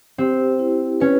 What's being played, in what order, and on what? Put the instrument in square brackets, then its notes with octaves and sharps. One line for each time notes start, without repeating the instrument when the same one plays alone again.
[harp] C4 [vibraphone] G4
[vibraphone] E4
[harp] C#4 [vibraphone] B4